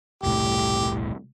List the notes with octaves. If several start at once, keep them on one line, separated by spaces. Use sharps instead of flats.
E1 C2 A2 G4